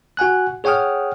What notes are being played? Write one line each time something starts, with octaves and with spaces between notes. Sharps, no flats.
F#4 F#5 G#5 F#6
G#4 C#5 F#5 G5 D#6 F6